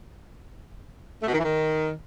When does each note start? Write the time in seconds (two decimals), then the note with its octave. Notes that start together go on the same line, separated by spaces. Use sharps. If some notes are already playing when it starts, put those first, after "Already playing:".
1.22 A3
1.27 B2
1.33 D#3
1.38 E3
1.43 D#3